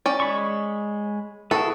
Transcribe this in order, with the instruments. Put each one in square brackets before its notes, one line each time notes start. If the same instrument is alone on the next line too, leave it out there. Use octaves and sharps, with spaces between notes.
[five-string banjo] C#4 D5
[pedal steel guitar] G#3 B5 C#6
[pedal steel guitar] E4 G#4 B4 [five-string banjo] F#4 A4